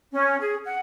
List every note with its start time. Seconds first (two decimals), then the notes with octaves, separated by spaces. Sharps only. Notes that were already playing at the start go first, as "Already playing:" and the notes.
0.13 C#4
0.40 G#4
0.64 F#5